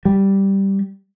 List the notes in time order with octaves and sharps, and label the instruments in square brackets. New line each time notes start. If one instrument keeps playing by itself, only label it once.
[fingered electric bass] G3